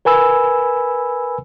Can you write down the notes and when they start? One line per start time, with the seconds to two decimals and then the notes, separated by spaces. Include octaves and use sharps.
0.05 A#4 B4 G#5 B5 E6